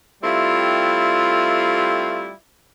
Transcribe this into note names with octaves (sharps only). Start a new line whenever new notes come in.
G3 A3 C4 E4 F4